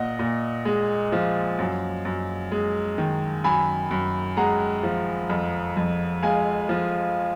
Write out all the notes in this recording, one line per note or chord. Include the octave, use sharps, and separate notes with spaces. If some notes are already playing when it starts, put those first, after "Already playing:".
Already playing: A#2 D#5 F#5
A#2
G#3
F3
F#2
F#2
G#3
D#3
F#2 G#5 B5
F#2
G#3 F#5 A#5
F3
F2
F2
G#3 F5 G#5
F3